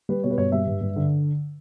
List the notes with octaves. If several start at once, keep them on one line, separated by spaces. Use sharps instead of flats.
G3 B4
B2 C#5
B4
G2 C#5
G3 E5
G2
G2
D3